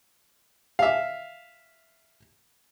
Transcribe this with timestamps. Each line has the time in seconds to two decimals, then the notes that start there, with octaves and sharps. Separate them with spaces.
0.79 E5 F5